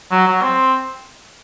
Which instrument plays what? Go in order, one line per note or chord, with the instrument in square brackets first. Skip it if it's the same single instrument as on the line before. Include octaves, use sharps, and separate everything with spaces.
[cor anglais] F#3
F#3
C4